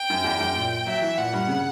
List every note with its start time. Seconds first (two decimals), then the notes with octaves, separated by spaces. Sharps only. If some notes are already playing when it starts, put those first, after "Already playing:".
Already playing: G5
0.10 F#2
0.24 E2
0.40 F#2
0.56 A#2
0.86 F#3 E5
1.02 E3
1.18 A#2 F#5
1.33 G2
1.48 C#3